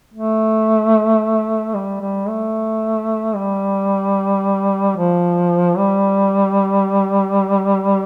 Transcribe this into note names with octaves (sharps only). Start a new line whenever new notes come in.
A3
G3
G3
A3
G3
F3
G3